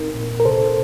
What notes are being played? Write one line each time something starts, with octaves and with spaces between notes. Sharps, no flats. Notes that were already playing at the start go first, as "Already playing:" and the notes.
Already playing: A#2 C4 D#4 A#4
A#2
A#4
C3 A4 C5